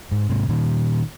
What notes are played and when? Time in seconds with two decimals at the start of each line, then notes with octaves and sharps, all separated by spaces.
0.11 G#2
0.30 G#2 C3
0.49 A#2 D#3